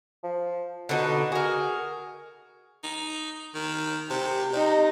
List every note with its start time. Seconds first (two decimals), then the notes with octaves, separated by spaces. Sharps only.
0.24 F3
0.89 B2 D3 D#4 F#4
1.32 F#4 G#4 A#4
2.84 D#4
3.55 D#3
4.10 C3 G4
4.53 C3 D#4